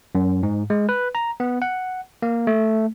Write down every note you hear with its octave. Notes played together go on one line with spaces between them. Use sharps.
F#2
G#2
G#3
B4
A#5
B3
F#5
A#3
A3